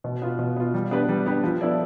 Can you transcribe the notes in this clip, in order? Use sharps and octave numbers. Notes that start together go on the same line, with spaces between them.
B2
B3 F4
B2
B3 F4
G3
B3 D4 G4 B4
G3
B3 D4 G4 B4
F3
B3 E4 A4 D5